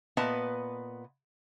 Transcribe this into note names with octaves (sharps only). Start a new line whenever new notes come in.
A#2 B3 B4 D#5 A5